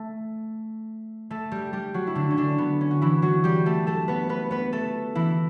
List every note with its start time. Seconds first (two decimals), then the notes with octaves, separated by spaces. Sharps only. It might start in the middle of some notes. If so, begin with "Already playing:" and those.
Already playing: A3
1.30 A3 A4
1.51 G3 G4
1.73 G3 G4
1.94 F#3 F#4
2.07 E4
2.15 D3 D4
2.30 C#4
2.37 D3 D4
2.58 B3
2.81 C#4
2.91 F#4
3.01 E3 E4
3.22 F#3 F#4
3.44 G3 G4
3.66 A3 A4
3.87 A3 A4
4.08 B3 B4
4.29 B3 B4
4.51 B3 B4
4.73 A3 A4
5.15 E3 E4